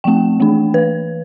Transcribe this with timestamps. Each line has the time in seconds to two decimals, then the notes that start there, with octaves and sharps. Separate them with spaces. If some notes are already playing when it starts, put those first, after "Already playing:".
0.04 F3 A3 C4 G5
0.40 E3 A3 D4
0.74 E3 B4